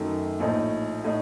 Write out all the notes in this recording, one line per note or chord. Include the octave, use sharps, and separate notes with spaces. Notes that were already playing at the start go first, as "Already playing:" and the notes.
Already playing: F#2 D#3 A3
A#1 A2 A3 D#4
A2 A3 D#4